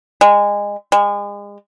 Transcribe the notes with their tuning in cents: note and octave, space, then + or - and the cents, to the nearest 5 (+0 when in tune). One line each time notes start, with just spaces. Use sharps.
G#3 -25
G#3 -35